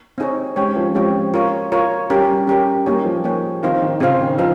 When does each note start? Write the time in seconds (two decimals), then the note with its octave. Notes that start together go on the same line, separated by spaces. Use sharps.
0.18 C4 D#4 G#4 C#5
0.56 G#3 C4 C#4 G4 C#5 G5
0.76 F3
0.95 F3 G#3 C4 G4 C#5 G5
1.34 F4 A#4 C#5
1.72 F4 A#4 C#5
2.10 G3 C#4 G4 A#4
2.29 G3
2.47 C#4 G4 A#4
2.86 G3 A#3 D#4 G#4 C#5 G5
3.05 F3
3.24 A#3 D#4 G#4 C#5 G5
3.63 D#3 C4 F4 C5 F5
3.82 D#3
4.00 C#3 C4 F4 C5 F5
4.20 D#3
4.38 F3 D#4 F5